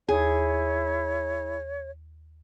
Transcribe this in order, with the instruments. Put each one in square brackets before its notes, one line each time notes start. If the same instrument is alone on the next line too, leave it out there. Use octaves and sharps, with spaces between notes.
[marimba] D#2 [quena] E4 [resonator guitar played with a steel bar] G#4 [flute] C#5